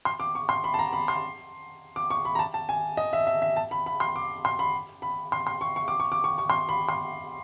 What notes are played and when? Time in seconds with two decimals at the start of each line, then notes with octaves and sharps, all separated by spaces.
0.05 C6
0.20 D6
0.35 C#6
0.49 C6
0.64 B5
0.74 A5
0.79 A#5
0.93 B5
1.08 C6
1.96 D6
2.10 C#6
2.25 B5
2.35 A#5
2.39 A5
2.54 A5
2.69 G#5
2.97 D#5
3.13 E5
3.27 E5
3.42 E5
3.57 A5
3.71 B5
3.86 B5
4.00 C6
4.16 D6
4.45 C6
4.59 B5
5.02 B5
5.32 C6
5.47 C6
5.61 C#6
5.76 C#6
5.88 D6
6.00 C#6
6.12 D6
6.24 C#6
6.38 C#6
6.50 C6
6.69 B5
6.89 C6